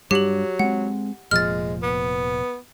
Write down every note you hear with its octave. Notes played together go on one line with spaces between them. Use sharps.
G2 F#3 G3 G4 F#7
G#3 C4 F#5
F1 A#2 F3 G#3 F6 A6
B3